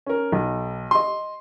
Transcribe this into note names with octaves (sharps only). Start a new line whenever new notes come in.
C#4 A#4
B1
D#5 C6